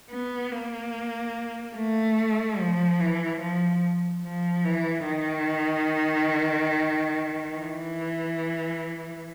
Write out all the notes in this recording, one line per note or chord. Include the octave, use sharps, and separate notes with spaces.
B3
A#3
A3
F3
E3
F3
F3
E3
D#3
E3